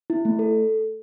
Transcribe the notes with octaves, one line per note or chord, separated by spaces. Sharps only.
E4
A3
A4